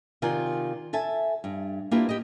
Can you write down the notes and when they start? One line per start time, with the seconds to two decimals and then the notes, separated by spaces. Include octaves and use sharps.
0.22 C3 D#3 F4 D5 F#5 G#5
0.93 A4 E5 G#5 A5
1.44 G2
1.91 A#3 D4 E4 F4 G4 B4
2.09 G4 D#5